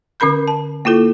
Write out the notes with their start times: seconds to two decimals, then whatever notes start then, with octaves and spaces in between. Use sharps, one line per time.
0.20 D3 C#4 A#4 B5 G6
0.48 A5
0.85 A#3 E4 F4 A4